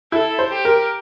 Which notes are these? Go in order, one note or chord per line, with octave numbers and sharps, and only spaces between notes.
E4 A4
C5
G4
A#4